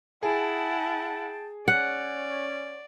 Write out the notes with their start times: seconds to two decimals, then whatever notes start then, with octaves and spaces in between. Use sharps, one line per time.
0.23 E4 G#4 F#5 G5 A5
1.68 C#4 C#5 D5 F#5